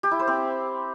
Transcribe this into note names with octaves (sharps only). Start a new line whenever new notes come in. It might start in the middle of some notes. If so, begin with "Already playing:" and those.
G4
E4
C5
C4